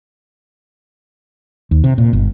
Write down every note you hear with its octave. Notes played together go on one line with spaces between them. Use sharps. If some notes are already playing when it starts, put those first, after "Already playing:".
D#2
C3
A#2
G1